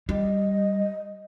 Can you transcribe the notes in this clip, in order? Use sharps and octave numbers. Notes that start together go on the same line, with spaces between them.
G3 D#5